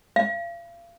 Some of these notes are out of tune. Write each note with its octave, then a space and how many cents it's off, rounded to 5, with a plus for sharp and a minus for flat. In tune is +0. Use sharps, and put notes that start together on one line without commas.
F5 -35